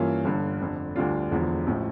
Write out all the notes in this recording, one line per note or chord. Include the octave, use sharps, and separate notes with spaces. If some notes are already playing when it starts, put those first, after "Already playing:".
Already playing: G2 E3 A#3 C#4 F4
G1 G2 D3
F1 F2 D3
D2 D3 G3 D4 F4
E1 E2 D3 F3
A1 A2 F3